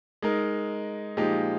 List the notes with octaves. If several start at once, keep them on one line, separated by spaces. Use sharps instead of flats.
G#3 D#4 A#4
A#2 F3 G#3 D#4 G4